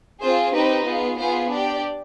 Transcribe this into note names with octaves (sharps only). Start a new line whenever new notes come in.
C4 F4 G#4 C5
C4 D#4 G4 B4
B3 F4 G#4
B3 F4 G#4 C5
D4 G4 D5